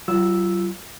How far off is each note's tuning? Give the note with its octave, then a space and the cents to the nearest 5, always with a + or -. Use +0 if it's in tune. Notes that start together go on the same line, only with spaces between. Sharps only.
F#3 +40 F4 -25 E6 +0